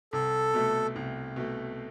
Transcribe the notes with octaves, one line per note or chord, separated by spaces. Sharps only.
C2 A4
B2 A3
C2
B2 A3